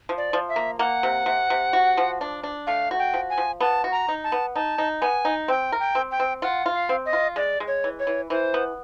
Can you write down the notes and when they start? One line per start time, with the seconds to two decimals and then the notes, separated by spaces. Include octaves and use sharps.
0.09 F3
0.18 D5
0.33 F3
0.49 E5
0.56 A#3
0.79 A#3 F#5
1.03 C3
1.26 C3
1.50 C3
1.73 F#4
1.97 F3
2.21 D4
2.43 D4
2.67 A3 F5
2.91 F#4
2.99 G5
3.14 F3
3.30 G#5
3.38 F3
3.61 B3 A5
3.84 F#4
3.92 A#5
4.08 D#4
4.24 A5
4.32 B3
4.55 D#4 A5
4.78 D#4
5.01 B3 G#5
5.25 D#4
5.48 C4 G5
5.72 A#4
5.80 G5
5.95 C4
6.11 G5
6.20 C4
6.42 F4 F#5
6.66 F4
6.74 F5
6.89 C4
7.06 D#5
7.13 F4
7.36 G#3 D5
7.60 G#3
7.67 C#5
7.84 E3
7.99 C#5
8.07 E3
8.30 E3 C5
8.54 B3